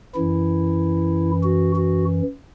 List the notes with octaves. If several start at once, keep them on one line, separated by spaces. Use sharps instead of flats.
F#2 E3 E4
F#4
F#4